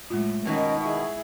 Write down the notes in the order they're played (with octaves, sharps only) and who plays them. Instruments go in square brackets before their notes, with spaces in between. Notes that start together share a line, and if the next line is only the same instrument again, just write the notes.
[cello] F#2 A2 [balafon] G#3 F4
[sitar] B2 D#3 [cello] C#4 A#4
[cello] E4 G#4